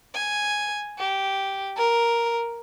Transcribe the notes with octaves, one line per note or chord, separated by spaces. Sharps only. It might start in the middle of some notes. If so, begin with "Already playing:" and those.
G#5
G4
A#4